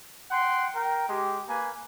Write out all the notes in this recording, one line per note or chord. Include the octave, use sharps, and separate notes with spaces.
F#5 G5 C6
A#4 G5
G#3 G4
A#3 B4 G#5